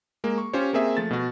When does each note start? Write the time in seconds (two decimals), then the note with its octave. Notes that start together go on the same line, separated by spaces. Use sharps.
0.24 G#3 A#3
0.38 C#6
0.53 C#4 F4 G4 C5 C#5
0.73 A#3 C4 G#4 E5
0.97 F3 A3 A6
1.10 B2 F#4